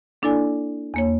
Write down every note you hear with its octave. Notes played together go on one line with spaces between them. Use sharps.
A#3 D4 E4 A4 D5 G#5
E2 A#3 C#5